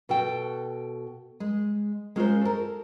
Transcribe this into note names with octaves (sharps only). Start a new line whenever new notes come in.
B2 F#4 A4 G5
G#3
G#3 C#4 F4 F#4 A#4 C5
A4 A#4